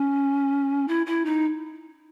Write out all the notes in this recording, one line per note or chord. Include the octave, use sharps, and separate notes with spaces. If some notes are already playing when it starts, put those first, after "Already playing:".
Already playing: C#4
E4
E4
D#4